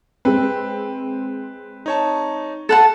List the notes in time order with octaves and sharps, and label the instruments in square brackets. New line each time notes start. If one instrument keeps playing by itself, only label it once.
[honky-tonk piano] G#3 C4 [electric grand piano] B4
[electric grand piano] D#4 C#5 A5
[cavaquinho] A4 F#5 A5